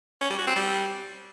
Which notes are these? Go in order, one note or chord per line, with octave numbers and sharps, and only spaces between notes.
C#4
G3
F#4
C4
G3